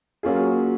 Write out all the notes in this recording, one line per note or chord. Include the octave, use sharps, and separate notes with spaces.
F#3 A#3 C#4 F4 G#4